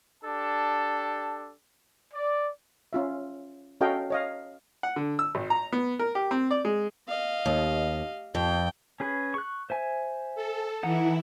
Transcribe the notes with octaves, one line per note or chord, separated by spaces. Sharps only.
D4 G4 A4 A5
D5
C#4 F4 E5
C#4 F#4 A4 D#5 F5 G5
C#5 D#5 F5
F#5
D3
E6
G#1
A#5
B3
A#4
G4
C4
D5
G#3
D#5 F5
D#2
F2 G5
C#4 G#4 B4
C#6 F#6
C5 E5 G#5
A4
E3 D#4 E4 F#5